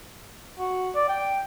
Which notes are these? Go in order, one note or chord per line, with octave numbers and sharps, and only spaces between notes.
F#4
D5
G5